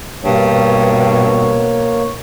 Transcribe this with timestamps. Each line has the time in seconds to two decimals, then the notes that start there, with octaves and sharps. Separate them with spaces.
0.24 G2 B2 A#3 C#5